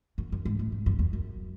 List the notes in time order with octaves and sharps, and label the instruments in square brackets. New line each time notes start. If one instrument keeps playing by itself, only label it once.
[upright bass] F#2
F#2
G#2
A2
G#2
F#2
E2
F#2